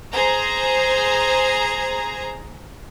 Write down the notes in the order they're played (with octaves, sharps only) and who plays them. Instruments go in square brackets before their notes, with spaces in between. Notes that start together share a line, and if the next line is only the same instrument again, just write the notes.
[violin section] G#4 C5 A#5